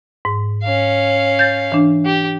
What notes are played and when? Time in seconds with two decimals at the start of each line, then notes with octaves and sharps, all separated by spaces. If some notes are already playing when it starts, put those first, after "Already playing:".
0.25 G#2
0.63 C#4 F5
1.39 G6 A6
1.72 E3 D4
2.05 G4